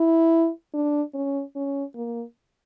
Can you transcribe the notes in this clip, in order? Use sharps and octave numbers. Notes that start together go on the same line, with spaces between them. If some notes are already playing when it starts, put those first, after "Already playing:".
Already playing: E4
D4
C#4
C#4
A#3